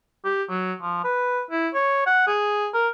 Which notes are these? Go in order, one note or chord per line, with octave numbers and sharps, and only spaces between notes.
G4
F#3
F3
B4
E4
C#5
F#5
G#4
A#4